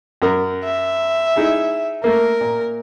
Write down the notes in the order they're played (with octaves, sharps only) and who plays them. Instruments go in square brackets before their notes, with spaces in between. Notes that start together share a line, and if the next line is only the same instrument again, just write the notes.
[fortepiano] F#2 A#4 A#5
[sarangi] E5
[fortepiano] G#3 D#4 E4
[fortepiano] A3 A#3 [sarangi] A#4
[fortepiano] A#2